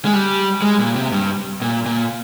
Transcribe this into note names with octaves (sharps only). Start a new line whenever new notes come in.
G#3
G3
G#3
A#2
C3
G2
A#2
A#2